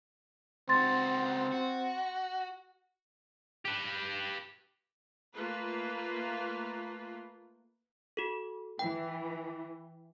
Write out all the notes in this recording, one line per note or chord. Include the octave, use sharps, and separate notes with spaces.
C#2 C4 F#4 C6 A6
F#4
G4 B4
A3 A#3 F4 B4
F#4 A4
E3 G5